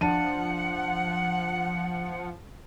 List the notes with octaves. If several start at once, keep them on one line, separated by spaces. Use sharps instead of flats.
F3 D4 F#5 A5 D#7